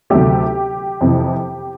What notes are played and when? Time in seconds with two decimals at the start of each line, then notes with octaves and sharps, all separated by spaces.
0.10 D2 C3 D#3 F#3 A3 G4
1.01 F2 C3 E3